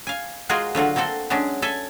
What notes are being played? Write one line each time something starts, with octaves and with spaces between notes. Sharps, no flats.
F5 G#5
G#3 F4 F#4 G#4 A#4 C5
D3 F#3 F4 F#4
A#3 C4 F#4 A4 C5
F#3 G#3 C#4 D4
A4 E5 G#5